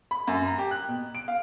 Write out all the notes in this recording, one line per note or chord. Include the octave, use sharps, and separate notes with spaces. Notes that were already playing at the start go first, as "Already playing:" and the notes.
B5
F#2
A#5
G4
F#6
B2
D7
F5